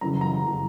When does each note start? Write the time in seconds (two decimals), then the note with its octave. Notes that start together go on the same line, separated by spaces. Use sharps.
0.01 F#2 C#3 E3 A#5
0.21 A#5
0.42 F#2 C#3 E3